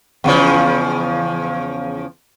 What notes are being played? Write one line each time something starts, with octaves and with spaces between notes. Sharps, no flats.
E2 C#3 F3